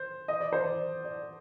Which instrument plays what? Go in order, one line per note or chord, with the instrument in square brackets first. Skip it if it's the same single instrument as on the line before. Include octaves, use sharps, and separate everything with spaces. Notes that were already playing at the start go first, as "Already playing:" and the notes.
Already playing: [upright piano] C5
D#5
D5
C5
D5
D5